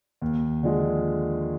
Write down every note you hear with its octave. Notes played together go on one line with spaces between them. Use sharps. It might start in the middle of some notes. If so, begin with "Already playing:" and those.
D#2
D3 F3 G#3